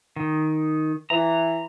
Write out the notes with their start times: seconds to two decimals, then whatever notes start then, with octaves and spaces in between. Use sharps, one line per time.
0.16 D#3
1.10 E3 A#5